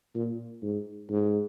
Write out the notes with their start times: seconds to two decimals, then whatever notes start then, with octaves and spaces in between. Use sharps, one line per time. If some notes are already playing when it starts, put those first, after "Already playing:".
0.15 A#2
0.62 G#2
1.10 G#2